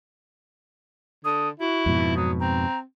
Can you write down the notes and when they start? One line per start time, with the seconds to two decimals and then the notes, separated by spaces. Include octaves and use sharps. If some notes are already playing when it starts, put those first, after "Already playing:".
1.25 D3 D#6
1.59 E4 F#4
1.86 F2 G#2 B2
2.16 F#3 D#6
2.40 C4 A#5